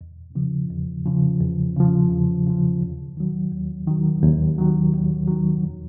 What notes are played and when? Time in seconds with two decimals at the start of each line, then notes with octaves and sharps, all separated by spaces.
0.01 E2
0.35 C#3 F3
0.70 E2
1.06 C#3 F3
1.41 E2
1.77 C#3 F3
2.11 E2
2.47 C#3 F3
2.81 D#2
3.17 D#3 F#3
3.52 D#2
3.87 D#3 F#3
4.23 D#2
4.58 D#3 F#3
4.93 D#2
5.28 D#3 F#3
5.64 E2